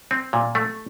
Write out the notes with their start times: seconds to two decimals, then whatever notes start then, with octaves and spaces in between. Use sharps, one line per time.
0.11 C4
0.33 A#2
0.55 A3